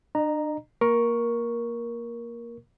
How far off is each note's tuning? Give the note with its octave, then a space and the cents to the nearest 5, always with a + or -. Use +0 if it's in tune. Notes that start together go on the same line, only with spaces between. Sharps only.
D4 +35 D#5 -35 A#5 +0
A#3 +0 A#4 +15 C#6 +0